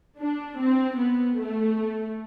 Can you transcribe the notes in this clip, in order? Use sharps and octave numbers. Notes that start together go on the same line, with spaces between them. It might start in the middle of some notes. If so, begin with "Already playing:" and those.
D4
C4
B3
A3